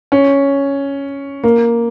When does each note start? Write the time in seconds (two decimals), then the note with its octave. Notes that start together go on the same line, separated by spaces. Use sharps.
0.12 C#4
1.44 A#3